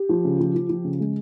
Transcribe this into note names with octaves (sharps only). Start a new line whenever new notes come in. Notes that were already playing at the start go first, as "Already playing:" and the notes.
Already playing: G4
F3
C#3
F3
F3
F3
C#3
G#3